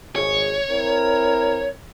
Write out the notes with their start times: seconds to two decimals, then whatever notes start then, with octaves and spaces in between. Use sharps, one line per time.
0.16 G#1 G#4 C#5
0.70 C4 E4 A#4